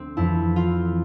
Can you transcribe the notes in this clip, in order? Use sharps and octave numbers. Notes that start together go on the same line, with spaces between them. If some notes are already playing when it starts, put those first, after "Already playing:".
Already playing: D2 C4
F2 E3 E4
F4